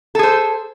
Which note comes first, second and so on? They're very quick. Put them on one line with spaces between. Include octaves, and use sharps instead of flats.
A4 G#4 C5